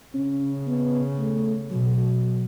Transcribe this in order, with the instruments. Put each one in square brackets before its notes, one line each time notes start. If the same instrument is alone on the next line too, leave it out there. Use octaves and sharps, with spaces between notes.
[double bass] C#3 [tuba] C#4
[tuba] B3
A3
[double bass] B2 [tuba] F#3